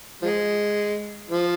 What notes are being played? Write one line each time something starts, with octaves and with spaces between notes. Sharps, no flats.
F3 G#3
F3